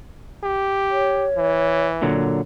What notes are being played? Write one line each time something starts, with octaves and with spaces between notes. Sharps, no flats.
G4
C#5
E3
A#2 D3 F#3